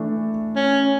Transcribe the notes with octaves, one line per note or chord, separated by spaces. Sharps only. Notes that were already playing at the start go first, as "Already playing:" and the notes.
Already playing: E3 A3 D4
C#4